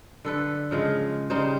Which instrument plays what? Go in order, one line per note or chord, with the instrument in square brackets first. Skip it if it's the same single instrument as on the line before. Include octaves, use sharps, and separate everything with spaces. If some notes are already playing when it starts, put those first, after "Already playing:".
[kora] D3 A4 B4
C#3 F3 G#3
C#3 G3 D#4 C5